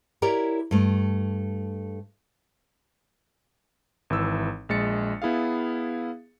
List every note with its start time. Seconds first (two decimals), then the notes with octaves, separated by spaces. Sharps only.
0.22 E4 G4 A#4 C#5 D5
0.71 G2 A3
4.10 G#1 E3 E6
4.69 A#1 G#3 D#5 A6 C#7
5.22 B3 E4 G#4 F5